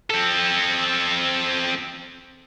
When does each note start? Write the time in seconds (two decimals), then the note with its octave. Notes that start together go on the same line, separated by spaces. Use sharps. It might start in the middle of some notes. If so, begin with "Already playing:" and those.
0.10 C4 A4